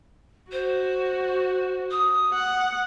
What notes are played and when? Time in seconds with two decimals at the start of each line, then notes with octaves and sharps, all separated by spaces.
0.51 F#4 C5
1.91 D#6
2.33 F#5